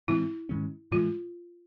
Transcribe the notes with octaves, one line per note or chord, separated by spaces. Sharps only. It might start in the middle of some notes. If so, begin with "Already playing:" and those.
A2 E3 G#3 C4 E4
G#2 D#3 G#3 C#4
A2 E3 G#3 F4